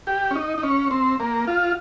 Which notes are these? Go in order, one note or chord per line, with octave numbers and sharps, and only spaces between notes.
G4
C#4
D#4
D#4
C#4
C4
A#3
F4